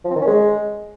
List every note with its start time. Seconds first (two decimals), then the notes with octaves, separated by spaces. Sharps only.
0.05 F3
0.10 C4
0.16 D#3
0.21 C#4
0.27 G#3